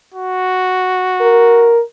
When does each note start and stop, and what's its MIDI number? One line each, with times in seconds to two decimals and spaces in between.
0.14 1.78 66
1.21 1.81 70